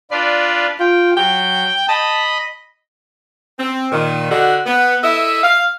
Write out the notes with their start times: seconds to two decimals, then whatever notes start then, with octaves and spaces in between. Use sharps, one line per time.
0.11 D4 F4 B4 D5
0.80 F4 G5
1.17 F#3 G5
1.88 D#5 A5 B5 D#6
3.59 C4
3.92 A#2 D#3
4.31 D3 D#4 F#4
4.66 B3
5.04 E4 A4 D#5 E5
5.43 F5